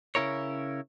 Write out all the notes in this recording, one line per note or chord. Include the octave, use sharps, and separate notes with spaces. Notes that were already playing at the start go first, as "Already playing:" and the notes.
C#3 C#4 E4 A#4 C#5